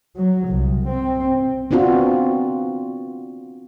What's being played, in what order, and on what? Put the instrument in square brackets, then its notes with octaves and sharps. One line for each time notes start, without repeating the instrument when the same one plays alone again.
[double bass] F#3
C2
C4
[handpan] B3 C4 D4 F4 F#4